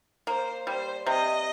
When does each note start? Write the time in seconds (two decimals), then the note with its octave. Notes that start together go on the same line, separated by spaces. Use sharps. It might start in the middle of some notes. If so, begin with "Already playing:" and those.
0.27 A#3 C5
0.67 G3 C5
1.06 C3 D#5